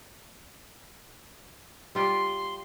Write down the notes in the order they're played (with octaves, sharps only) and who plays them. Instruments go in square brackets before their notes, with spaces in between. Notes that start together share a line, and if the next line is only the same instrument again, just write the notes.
[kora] G3 F4 G4 [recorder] C6